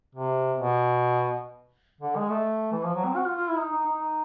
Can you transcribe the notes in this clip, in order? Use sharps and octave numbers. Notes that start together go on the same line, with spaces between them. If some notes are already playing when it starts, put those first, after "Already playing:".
C3
B2
D3
G#3
A3
E3
F3
F#3
C4
F#4
F4
F4
E4
D#4
D#4
D#4
D#4